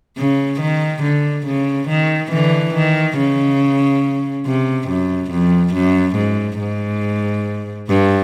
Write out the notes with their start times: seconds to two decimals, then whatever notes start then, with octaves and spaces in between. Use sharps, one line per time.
0.18 C#3
0.61 D#3
1.03 D3
1.46 C#3
1.88 D#3
2.32 D3 E3
2.75 D#3
3.18 C#3
4.46 C3
4.89 F#2
5.32 F2
5.74 F#2
6.17 G#2
6.60 G#2
7.89 G2